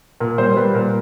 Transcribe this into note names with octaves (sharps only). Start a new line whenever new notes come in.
A#2 A#4
G3 C5
G3 B4
A#2 A#4